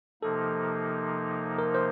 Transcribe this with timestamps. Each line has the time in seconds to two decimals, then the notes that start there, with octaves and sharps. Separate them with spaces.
0.22 C3 F3 A#3 D#4 A4
1.58 A#4
1.75 C5